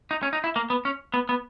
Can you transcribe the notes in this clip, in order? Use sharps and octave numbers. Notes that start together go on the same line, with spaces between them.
D#4
C#4
D#4
E4
A#3
B3
C#4
B3
B3